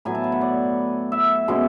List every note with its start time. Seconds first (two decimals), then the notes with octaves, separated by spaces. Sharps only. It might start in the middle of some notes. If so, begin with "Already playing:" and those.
0.05 A2 F#3 B3 G#5
0.15 A5
0.24 G#5
0.32 F#5
0.41 D5
1.12 E5
1.48 B2 G#3 C#4 E4